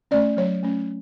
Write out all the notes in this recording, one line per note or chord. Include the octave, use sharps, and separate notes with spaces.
A3 C#4 D5
F#3 C#5
A3 C#4